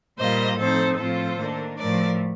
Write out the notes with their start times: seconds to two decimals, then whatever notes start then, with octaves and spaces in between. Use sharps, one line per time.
0.18 A#2 G3 A#3 F4 C5 D#5
0.58 A2 F3 C4 D#4 A4 C5
0.98 A2 F3 C4 F4 A4 C5
1.38 D#3 A#3 D4
1.78 A2 F3 A3 A#4 D5